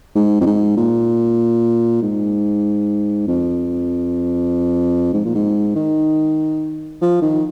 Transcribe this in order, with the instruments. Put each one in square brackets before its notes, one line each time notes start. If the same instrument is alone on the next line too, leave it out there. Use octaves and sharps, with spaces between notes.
[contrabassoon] G#2
F2
G#2
A#2
G#2
F2
G#2
A#2
G#2
D#3
F3
D#3